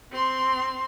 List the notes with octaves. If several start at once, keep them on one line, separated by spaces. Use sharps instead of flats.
C4 C6